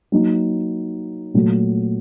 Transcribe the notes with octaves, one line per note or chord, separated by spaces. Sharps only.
F#3 A#3 D#4
A#2 F#3 A3